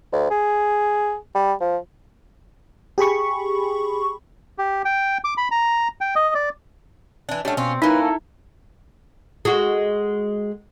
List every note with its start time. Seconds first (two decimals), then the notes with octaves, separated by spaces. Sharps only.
0.13 D2
0.31 G#4
1.35 G3
1.61 F3
2.98 G4 G#4 B5 C#6
4.58 G4
4.85 G5
5.24 D6
5.37 B5
5.51 A#5
6.01 G5
6.16 D#5
6.35 D5
7.29 E3 D4
7.45 G3 A3 C#4 D4 G4
7.57 B2 C4 C#4 F4
7.82 A#3 C#4 D#4 E4 A#4 B4
8.01 A4
9.45 G#3 F#4